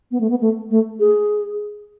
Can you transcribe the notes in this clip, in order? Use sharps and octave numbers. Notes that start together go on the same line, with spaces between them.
B3
A3
B3
A3
A3
G#4